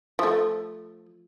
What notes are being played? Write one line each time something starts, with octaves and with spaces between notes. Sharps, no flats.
F3 A3